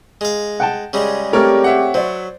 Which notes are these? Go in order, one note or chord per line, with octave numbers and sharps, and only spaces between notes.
G#3 F5
F#5 G5 A5
C#3 G3 G#3
A3 C4 G4 A#4 C#5 D5 F6
C#5 E5 F#5
F#3 C5 D5